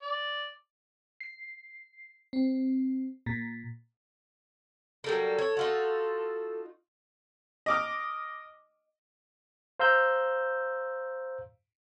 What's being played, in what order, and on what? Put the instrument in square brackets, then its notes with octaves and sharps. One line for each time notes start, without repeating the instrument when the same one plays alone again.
[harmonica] D5
[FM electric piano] C7
C4
A#2
[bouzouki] F#3 G3 A#3 [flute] A4
[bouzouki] C#5
D#4 F4 F#4
[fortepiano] D#5 D6 F6
[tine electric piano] C5 F5 A#5 E6 G6